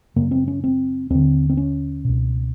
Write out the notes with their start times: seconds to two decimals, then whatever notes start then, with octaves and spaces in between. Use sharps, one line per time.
0.16 F#2 C#3 A#3
0.31 C4
0.48 C#4
0.64 C4
1.10 D#2 D3 C4
1.50 C4
1.57 C#4
2.05 C#2 B2